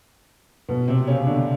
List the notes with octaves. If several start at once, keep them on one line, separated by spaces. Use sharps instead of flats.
B2 B3
C3 C4
C#3 C#4
D3 D4